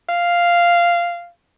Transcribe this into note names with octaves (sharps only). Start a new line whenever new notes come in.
F5